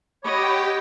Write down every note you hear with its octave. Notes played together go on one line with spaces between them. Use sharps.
G4 C#5 D#5 F#5 G5 B5 D6